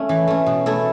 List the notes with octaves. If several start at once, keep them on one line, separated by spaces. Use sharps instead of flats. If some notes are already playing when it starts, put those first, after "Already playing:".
Already playing: A3 C#4
E3
A3 C#4
B2
A3 E4 A4